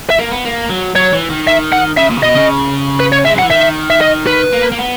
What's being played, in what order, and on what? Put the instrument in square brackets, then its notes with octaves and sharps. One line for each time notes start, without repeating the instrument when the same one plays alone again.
[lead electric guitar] E5
[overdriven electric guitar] A#3
B3
A#3
F#3
[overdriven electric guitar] F#3 [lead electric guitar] C#5
[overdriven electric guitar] E3
D#3
[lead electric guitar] E5
F#5
[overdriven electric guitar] C#3 [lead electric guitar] E5
[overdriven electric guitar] A#2
C#3
[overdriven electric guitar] B2 [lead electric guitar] D#5
[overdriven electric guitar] C#3
[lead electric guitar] B4
C#5
[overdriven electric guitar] G#3 [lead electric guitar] E5
[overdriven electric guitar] F#3
[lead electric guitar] F#5
[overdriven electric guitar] E3
[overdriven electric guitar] D#3 [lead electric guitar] E5
[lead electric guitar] E5
D#5
B4
[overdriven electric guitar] A#3
A#3
B3